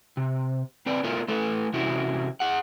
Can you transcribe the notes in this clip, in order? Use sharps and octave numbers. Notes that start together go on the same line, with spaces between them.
C3
C4 B4 D5
A3 B3 D#4 F4 A#4
A3 E4 A4 B4
C3 E3 C#4 E4 F#4
G#4 F#5